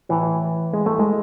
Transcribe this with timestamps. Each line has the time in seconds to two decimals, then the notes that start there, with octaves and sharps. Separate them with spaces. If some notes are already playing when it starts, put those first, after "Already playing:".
0.09 A2 E3
0.73 G#3
0.86 A3
0.99 G#3